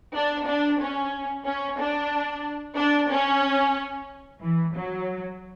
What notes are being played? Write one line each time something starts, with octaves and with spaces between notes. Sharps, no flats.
D4
D4
C#4
C#4
D4
D4
C#4
E3
F#3